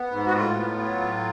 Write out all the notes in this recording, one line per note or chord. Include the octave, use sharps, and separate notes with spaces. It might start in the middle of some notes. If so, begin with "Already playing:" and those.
Already playing: B3
G#2
F#4
A2 F4
B3
F#3
A2